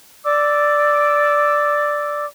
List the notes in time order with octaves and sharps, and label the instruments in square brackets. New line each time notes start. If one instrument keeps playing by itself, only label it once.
[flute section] D5 D6 E6